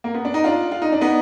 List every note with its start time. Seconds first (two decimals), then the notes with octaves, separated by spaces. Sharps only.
0.04 A#3
0.14 B3
0.25 D4
0.34 D#4
0.44 D4 F4
0.72 F4
0.82 D#4
0.92 D4
1.01 B3 D#4